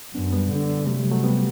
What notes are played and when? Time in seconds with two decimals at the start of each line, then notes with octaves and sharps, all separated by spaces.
0.14 F#2 B3 D4
0.33 G3 B3
0.51 D3
0.87 C3 F#3 A3
0.99 G3
1.11 F#3 A3
1.24 G3 B3